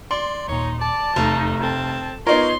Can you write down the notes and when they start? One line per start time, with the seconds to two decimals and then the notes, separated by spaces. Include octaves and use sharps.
0.11 D5 C6
0.48 D#2 A#2 D#4 C#5
0.81 D5 A5
1.16 F1 E2 A3 D#4
1.63 C4 A4 A5
2.27 B3 D#4 F4 A#4 C#5 C6